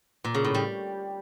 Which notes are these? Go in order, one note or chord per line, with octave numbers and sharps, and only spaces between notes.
A#2
C#3
A2
G3